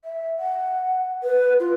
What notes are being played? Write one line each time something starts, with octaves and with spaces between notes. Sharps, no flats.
E5
F#5
B4
F4